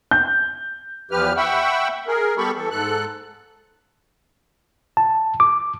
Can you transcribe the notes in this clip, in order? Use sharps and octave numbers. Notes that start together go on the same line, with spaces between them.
G6
E2 F3 G4 B4 F6
E5 F#5 G5 B5 C#6 E6
G#4 A#4
G3 B3 G4 A4 B5 C#6
E3 A4
G#2 A4 F#6
A5
D6